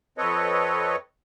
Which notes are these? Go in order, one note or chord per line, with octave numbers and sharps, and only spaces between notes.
F2 C4 A4 B4 C#5 D#5